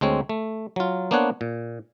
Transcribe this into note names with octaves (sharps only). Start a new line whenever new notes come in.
D2 G#3 C4 C#5
A3
F#3 F4
A#3 B3 D4 C5 C#5 F#5
A#2